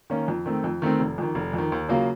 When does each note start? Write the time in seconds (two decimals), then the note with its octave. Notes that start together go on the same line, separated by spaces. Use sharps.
0.10 D#3 A#3 C#4
0.28 F2
0.46 D#3 A3 C4
0.64 F2
0.82 D#3 A3 C4
1.00 F1
1.18 F2 D#3
1.35 F1
1.53 F2 D#3
1.72 D#2
1.89 C#3 F#3 A#3 F4